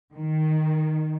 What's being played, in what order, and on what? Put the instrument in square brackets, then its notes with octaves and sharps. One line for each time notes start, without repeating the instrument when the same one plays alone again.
[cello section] D#3